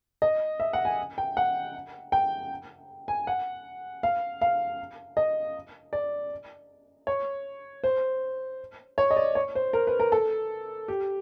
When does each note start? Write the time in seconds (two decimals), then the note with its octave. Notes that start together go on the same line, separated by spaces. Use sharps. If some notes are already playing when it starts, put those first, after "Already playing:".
0.22 D#5
0.60 E5
0.73 F#5
0.85 G#5
1.18 G5
1.37 F#5
2.12 G5
3.08 G#5
3.27 F#5
4.03 F5
4.41 F5
5.17 D#5
5.93 D5
7.07 C#5
7.84 C5
8.98 C#5
9.11 D#5
9.17 D5
9.35 C#5
9.55 C5
9.73 A#4
9.87 B4
10.00 A#4
10.12 A4
10.88 G4